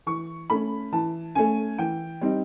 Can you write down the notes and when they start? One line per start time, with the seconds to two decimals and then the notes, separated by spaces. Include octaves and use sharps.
0.06 E3 C#6
0.50 A3 C#4 B5
0.93 E3 A5
1.35 A3 C#4 G#5
1.78 E3 G5
2.21 G3 C4 D#4